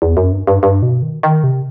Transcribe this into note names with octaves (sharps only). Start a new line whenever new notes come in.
E2
F#2
G2
G2
G2
B2
D#3
D#3
C3